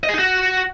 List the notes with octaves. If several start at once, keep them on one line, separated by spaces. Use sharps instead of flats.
D#5
G#4
D#4
F#4